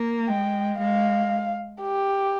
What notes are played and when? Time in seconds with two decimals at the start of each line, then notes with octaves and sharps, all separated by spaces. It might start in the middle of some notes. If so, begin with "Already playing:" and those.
Already playing: A#3
0.28 G#3 G5
0.80 G#3 F5
1.82 G4